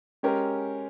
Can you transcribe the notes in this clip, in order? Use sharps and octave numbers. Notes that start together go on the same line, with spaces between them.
G#3 C#4 G4 A#4